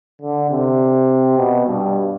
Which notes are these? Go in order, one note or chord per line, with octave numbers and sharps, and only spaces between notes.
D3
C3
B2
G2